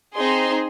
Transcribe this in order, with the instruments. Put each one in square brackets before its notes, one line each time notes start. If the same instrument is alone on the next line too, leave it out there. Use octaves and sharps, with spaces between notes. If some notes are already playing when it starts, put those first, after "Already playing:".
[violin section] C4 D#4 G#4 C6